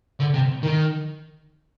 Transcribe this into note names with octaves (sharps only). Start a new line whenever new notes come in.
D3
C3
D#3